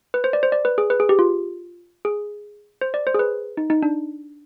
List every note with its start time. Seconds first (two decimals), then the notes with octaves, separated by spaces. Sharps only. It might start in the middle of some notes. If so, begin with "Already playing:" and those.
0.14 B4
0.24 C5
0.33 D5
0.43 C5
0.52 D5
0.65 B4
0.78 G#4
0.90 B4
1.00 G#4
1.09 G4
1.19 F4
2.05 G#4
2.81 C5
2.94 D5
3.07 C5
3.14 G#4
3.19 B4
3.57 D#4
3.70 D#4
3.83 D4